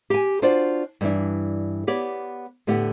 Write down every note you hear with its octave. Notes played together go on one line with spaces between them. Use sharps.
G4 G#5
D4 F4 F#4 C5 D5
G2 E3 D4
B3 G4 C#5 D5
A2 D3 B3 G4 F#5